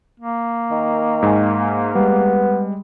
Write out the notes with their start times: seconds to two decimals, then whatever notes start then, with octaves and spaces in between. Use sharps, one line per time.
0.20 A#3
0.71 D#3
1.22 G#2 G#5
1.95 G3 G#3 B3